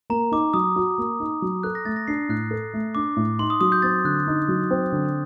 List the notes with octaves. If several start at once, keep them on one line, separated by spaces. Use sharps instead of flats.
A#3 A#5
D#4 D6
F#3 D#6
F#4
A#3
D#4
F#3
A4 F#6
A#6
A3 A6
A#6
D4 C7
A2 F#6
A4
A3
D4 D6
A2
D#4 C6
D#6
F#3 D#6
G6
C4 A6
D3 F#6
D#4
F#3
C4
D3